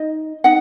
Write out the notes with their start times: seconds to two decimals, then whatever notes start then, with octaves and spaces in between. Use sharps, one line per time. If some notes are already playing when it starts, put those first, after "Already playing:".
Already playing: D#4 D#5
0.44 D#4 F#5